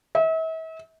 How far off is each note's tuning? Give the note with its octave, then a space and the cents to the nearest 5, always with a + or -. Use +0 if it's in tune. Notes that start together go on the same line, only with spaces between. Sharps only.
E5 -40